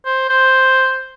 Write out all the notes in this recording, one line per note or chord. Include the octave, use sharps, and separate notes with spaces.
C5
C5